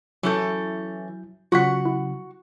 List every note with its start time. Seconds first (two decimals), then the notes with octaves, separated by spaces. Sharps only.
0.23 E3 F#3 C#4 E4 A4 G6
1.52 C#3 F#3 F4 F#4 F#5 C#6 B6
1.85 E4